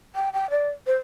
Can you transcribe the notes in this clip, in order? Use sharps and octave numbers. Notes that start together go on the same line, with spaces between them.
G5
G5
D5
C5